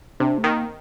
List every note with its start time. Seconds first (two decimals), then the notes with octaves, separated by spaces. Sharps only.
0.20 C3 D4
0.38 A3
0.44 D#3 A#3